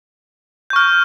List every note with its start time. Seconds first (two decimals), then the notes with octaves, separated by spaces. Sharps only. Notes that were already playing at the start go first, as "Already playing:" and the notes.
0.70 G6
0.73 C#6
0.76 F6